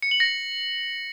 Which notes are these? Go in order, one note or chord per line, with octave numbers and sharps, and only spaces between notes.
C#7
F#7
A#6